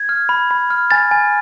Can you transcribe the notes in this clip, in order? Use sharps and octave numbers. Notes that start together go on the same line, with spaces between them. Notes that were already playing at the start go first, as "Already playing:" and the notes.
Already playing: G#6
F6
B5
B5
F6
G#5 A6
G#5